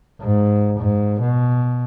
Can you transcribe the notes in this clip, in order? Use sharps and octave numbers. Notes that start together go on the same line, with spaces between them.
G#2
G#2
B2